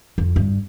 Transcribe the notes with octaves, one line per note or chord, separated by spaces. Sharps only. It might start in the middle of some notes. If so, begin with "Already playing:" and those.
F2
G2